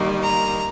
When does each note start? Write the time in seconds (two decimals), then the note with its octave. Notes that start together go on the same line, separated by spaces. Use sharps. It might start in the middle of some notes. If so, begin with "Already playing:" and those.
Already playing: D#3 G3 A#3
0.22 A#5